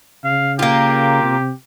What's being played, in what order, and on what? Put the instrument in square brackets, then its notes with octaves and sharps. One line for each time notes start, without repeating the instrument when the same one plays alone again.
[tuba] C#3 [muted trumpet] F5
[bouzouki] A#3 F4 [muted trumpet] G4
[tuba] C3